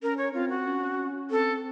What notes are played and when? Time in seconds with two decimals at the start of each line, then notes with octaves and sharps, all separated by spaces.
0.02 C#4 A#4
0.17 C#5
0.33 C4 F4
0.49 F#4
0.67 C#4
1.31 C4 A4